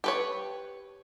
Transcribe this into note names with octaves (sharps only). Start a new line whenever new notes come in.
G4 B4 C#5